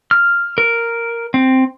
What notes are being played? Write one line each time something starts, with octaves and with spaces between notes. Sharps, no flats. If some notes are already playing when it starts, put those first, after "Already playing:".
F6
A#4
C4